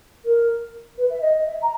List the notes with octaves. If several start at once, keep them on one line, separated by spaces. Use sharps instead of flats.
A#4
B4
E5
D#5
E5
A#5